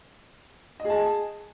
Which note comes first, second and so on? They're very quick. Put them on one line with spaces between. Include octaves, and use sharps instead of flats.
D#5 G#4 A5 G#5